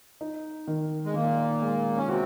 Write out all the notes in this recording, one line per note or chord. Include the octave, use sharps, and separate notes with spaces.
D#4
D#3
G#3
A#2 D#3 A#3
G#3
C#4
C3 C4 F#4